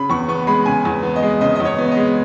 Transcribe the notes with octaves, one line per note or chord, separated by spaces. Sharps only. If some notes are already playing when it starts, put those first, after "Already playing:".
Already playing: C#3 B5
E2 C#6
B3 C#6
G#3 B5
C#3 G#5
E2
B3
D#5
G#3
C#3 D#5
E2 D#5
C#5
B3
D#5
G#3